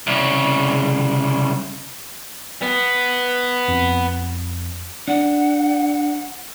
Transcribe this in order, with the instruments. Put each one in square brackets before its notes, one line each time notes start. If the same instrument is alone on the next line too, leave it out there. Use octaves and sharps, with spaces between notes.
[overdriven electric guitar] C2 C#3
B3
[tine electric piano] F2
[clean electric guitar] D4 [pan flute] F#5